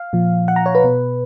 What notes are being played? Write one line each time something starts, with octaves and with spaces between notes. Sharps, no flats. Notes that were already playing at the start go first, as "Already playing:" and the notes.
Already playing: F5
A#2 F3
F#5
A#5
C#5
B4
B2